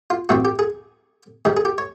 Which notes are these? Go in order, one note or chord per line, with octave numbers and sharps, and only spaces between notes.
F4
A1 G2 E3 G3 C4 F#4
G4
G#4
G#2 D#3 G3 G#4
G#4
G4
C#5